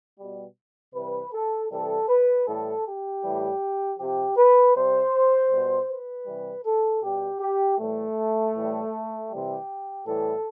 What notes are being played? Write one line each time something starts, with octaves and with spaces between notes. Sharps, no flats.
B2 G3
C3 E3 G3 B4
A4
C3 E3 G3 A4
B4
A2 E3 G3 A4
G4
A2 E3 G3
C3 F3 G4
B4
C3 G3 C5
B2 G3
B4
C3 E3 G3
A4
B2 G3 G4
G4
A2 E3 G3 A3
A2 E3 G3
C3 E3 G3 G4
A2 E3 G3 A4